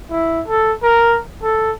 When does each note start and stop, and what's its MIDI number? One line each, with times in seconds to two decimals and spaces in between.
0.11 0.41 64
0.47 0.73 69
0.83 1.19 70
1.43 1.72 69